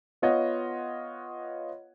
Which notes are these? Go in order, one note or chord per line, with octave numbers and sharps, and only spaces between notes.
B3 F4 C#5 D#5 F#5